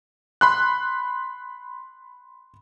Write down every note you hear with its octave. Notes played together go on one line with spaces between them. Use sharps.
B5 C6 F#6